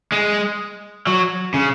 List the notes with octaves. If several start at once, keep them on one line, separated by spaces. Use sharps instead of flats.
G#3
F#3
C#3